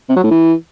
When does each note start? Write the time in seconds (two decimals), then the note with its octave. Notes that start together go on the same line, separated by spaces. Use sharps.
0.09 C3
0.16 F#3
0.24 A2
0.31 E3